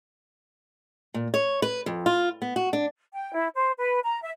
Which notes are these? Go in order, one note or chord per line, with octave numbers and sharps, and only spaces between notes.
A#2
C#5
B4
F2
F4
B3
F#4
D4
G5
E4
C5
B4
A#5
E5